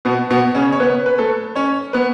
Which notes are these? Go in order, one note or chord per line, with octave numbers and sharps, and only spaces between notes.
B2 B3
B2 B3
C#3 C#4
C#5
B3 B4
B4
A3 A4
C#4 C#5
B3 B4